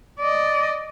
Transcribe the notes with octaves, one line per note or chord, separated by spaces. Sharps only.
D5 D#5